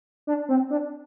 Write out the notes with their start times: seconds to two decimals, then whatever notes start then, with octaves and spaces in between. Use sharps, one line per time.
0.27 D4
0.49 C4
0.70 D4